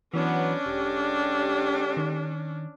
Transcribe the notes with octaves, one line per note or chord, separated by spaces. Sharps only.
E3 F#3 B3 C#4 D4
E1 D3 G#3 G4
D#3